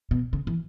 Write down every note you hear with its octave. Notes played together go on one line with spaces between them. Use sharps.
B2
C#3
E3